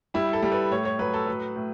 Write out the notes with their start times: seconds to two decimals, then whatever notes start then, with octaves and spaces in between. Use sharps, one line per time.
0.14 G3 E4
0.33 A4
0.42 G3
0.52 B4
0.71 A2 C#5
0.85 C#5
0.99 F#3 B4
1.14 A4
1.27 F#3 B4
1.56 A2